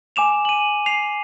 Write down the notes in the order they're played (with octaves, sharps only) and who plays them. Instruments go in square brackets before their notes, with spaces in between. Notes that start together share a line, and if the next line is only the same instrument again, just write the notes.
[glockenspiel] G#5 D6 E7 F7
D#7 F#7
C7 F7